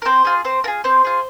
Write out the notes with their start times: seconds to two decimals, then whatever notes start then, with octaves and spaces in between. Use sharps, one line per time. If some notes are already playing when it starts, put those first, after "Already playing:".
0.02 A#4
0.05 C4 C5
0.25 F4 G#4
0.44 C4 C5
0.64 F4 G#4 A#4
0.84 C4 C5
1.04 F4 G#4